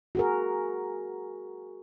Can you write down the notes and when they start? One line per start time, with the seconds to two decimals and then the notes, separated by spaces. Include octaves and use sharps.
0.15 F#4 G#4 A#4